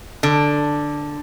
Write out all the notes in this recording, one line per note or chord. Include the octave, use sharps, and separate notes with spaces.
D3